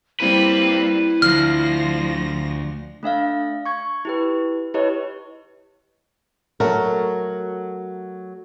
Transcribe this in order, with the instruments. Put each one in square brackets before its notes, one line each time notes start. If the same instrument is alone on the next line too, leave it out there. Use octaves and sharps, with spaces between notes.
[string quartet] G3 A#3 C4 [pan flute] E4 [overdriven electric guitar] B4
[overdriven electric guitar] D2 [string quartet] F3 A#6 [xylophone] F6
[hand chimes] A3 D4 E5 F5
C#6 G#6
E4 G4 B4
E4 G4 B4 C#5 D#5
[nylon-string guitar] F#3 A3 A#4